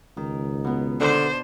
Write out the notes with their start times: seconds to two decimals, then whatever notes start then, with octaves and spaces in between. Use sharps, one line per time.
0.17 C#2 D#3
0.64 B2 B3
1.00 D3 D4 C5 D5